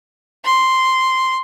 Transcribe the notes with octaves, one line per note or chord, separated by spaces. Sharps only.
C6